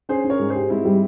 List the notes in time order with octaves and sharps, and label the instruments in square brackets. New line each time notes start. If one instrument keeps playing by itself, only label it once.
[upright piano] C#4 [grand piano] G#4 C5
[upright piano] C#4
[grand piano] A#4 C#5
[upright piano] G#2
[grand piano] G#4 C5
[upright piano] G4
[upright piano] G#2 [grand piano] C4 E4
[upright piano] G3